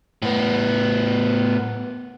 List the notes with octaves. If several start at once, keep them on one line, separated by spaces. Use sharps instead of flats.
A2 B3